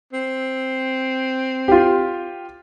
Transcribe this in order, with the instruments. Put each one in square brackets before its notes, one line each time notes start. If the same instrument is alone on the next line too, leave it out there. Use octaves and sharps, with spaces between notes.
[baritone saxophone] C4
[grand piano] F4 G4